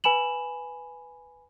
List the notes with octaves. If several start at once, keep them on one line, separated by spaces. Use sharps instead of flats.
B4 G#5 B5 E7 F#7